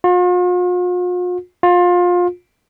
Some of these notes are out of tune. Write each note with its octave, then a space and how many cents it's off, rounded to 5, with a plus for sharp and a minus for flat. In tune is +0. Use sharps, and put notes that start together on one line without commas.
F4 +45
F4 +25